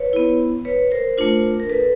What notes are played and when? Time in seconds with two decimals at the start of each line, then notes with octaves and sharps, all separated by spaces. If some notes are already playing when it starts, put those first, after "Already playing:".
Already playing: B4 C#5
0.13 B3 E4
0.65 B4 C#5
0.91 A#4 C5
1.18 A3 D4 F4
1.60 A#4
1.70 A4 B4